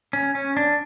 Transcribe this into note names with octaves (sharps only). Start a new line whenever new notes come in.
C#4
C#4
D4